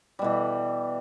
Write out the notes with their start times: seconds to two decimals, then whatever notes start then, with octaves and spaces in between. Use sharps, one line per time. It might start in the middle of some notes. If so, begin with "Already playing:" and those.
0.19 G3
0.22 B2
0.24 E3